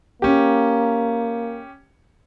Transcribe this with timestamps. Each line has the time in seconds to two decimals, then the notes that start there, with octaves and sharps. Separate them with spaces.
0.22 A#3 C#4 G4